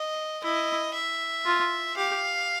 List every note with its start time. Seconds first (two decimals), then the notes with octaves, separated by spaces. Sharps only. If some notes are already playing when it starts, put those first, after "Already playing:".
Already playing: D#5
0.43 E4 D#5
0.94 E5
1.46 F4
1.97 G4 F5